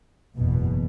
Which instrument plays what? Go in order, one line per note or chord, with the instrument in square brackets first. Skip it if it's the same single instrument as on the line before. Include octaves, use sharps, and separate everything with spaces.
[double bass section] F#1 E2 B2